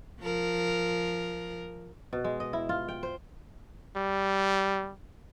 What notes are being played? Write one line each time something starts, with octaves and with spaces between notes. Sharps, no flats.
F3 A#4
B2
G#3
D#5
E4
F4
G5
C5
G3